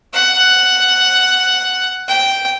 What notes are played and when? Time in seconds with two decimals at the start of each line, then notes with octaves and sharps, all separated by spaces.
0.14 F#5
2.08 G5